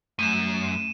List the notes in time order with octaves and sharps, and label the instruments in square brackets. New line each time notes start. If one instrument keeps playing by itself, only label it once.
[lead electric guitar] F#2 [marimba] A3 [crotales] D#7 E7